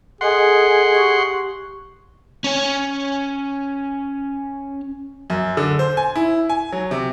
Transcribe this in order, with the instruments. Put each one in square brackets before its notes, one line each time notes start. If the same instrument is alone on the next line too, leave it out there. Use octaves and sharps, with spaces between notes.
[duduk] G#4 [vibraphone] A4 D#5 G#5 [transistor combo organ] F#5 C6
[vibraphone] G4 C#6
[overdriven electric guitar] C#4 C#5
[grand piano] F#2
D3
C5
G#5
E4
G#5
F#3
C3